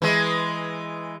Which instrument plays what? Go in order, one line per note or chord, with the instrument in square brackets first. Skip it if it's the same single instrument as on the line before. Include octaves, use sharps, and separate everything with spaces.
[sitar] E3 G#3